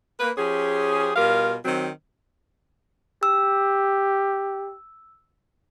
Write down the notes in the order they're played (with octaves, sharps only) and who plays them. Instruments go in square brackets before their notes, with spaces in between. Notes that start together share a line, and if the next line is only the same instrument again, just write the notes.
[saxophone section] A#3 B4
F3 C#4 G4 G#4
B2 G3 F4 A#4 F5
D#3 F#3 C4
[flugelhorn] G4 [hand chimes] E6